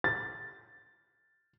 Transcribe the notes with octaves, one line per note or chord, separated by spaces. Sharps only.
A6